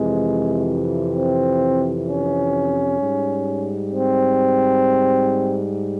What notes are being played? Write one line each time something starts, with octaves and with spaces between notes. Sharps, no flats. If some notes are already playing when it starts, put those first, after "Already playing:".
Already playing: F2 C3 E3 G#3
C4
C#4
G#2 G3
C4